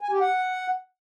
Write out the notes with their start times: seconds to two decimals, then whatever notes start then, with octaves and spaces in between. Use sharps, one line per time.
0.01 G#5
0.11 G4
0.20 F#5